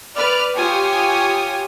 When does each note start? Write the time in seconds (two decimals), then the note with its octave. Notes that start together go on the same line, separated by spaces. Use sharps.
0.15 B4 D5 F6
0.56 F4 G4 C#5 G5 G#5 D#6